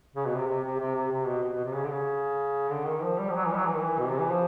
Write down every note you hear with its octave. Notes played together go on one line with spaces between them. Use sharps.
C#3
B2
C3
C3
C3
C3
C3
C3
B2
B2
B2
C3
C#3
D3
C#3
D3
D#3
F3
G3
F3
F#3
E3
G3
F#3
E3
D#3
E3
B2
C3
E3
F3